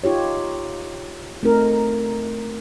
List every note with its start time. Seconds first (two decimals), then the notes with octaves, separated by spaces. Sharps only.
0.04 D#4 F4 G4 C#5
1.43 A3 C4 D#4 A#4